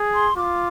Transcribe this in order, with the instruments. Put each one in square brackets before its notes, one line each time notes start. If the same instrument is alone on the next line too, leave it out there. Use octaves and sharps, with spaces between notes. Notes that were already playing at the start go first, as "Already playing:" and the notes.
Already playing: [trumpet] G#4
[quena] C6
[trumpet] F4 [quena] D6